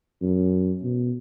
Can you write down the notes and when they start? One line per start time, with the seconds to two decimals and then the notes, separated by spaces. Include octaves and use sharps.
0.22 F#2
0.83 B2